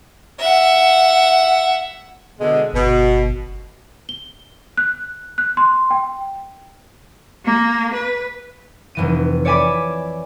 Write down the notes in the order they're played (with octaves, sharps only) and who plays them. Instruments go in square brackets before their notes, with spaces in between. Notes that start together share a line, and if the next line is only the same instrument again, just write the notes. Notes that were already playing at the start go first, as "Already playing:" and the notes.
[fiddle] E5 F#5
[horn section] B2 D3 G#3
[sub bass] G1 [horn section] B2
[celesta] G7
F#6
F#6
C6
G5
[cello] A#3
B4
[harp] F1 E3 D#7
C#5 D5 E5 G#5 B5 D6